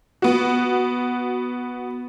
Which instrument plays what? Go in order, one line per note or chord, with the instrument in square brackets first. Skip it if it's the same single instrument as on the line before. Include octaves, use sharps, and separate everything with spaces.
[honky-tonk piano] B3 F#4